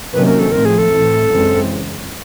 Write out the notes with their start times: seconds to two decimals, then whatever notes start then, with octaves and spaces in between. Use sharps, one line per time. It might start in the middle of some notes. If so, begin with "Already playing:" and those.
0.13 C3 D#3 F#3 A#3 C#4 B4
0.26 A#4
0.39 A4
0.52 A2 F3 A3 C4 A#4
0.65 G#4
0.78 A4
0.91 A2 E3 A3 C4
1.30 F#2 C#3 E3 G#3 C4